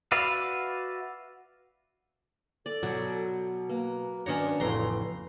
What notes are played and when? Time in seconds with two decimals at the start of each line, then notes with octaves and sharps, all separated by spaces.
0.12 F#4 B4 D5 E5 F5
2.66 A4 D5
2.83 B2 F#3
3.69 A#3 B4
4.26 D#3 C#4 D4 C#5 A#5
4.60 A1 F2 A2 C#3 A#5 C6